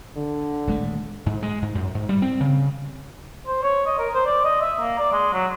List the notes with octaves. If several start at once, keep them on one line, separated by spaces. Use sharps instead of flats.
D3
D#1 G#3 A3
G#2
G#3
G#2
F#2
G#2
G3
C4
C#3
C5
C#5
D#5
A#4
C5
D5
D#5
E5
A#3
D5
G#3
F#3